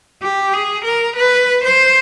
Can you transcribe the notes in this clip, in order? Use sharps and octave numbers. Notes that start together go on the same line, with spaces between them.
G4
G#4
A#4
B4
C5